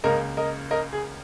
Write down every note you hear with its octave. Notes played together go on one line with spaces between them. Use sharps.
C#2 C#3 A#3 A#4 D#5
A#4 D#5
A#4 D#5
G#4